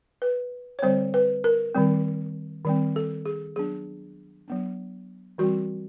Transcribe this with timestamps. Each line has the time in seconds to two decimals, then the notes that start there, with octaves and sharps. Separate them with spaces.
0.22 B4
0.79 C#5
0.82 D3 G3 C4 C5
1.14 B4
1.44 A#4
1.75 D#3 G3 C4
2.65 D#3 G3 C4
2.96 A4
3.26 G#4
3.56 F#3 B3 D4 G#4
4.48 F#3 B3 D4
5.38 E3 G3 C4 F#4